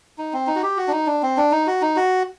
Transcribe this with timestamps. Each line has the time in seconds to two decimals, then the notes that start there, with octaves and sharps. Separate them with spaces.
0.18 D#4
0.33 C4
0.47 D#4
0.56 F#4
0.62 G4
0.77 F#4
0.87 D4
0.92 D#4
1.07 D4
1.22 C4
1.37 D4
1.52 D#4
1.67 F#4
1.82 D#4
1.96 F#4